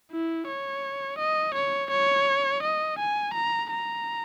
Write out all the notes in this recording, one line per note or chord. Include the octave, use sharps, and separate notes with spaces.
E4
C#5
D#5
C#5
C#5
D#5
G#5
A#5
A#5